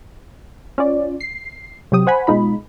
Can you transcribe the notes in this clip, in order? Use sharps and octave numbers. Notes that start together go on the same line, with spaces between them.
C#4 F4 D5
C7
C3 F#3 G4 D#6
C5 F#5 G#5 B5
B2 G#3 D#4 F4 B5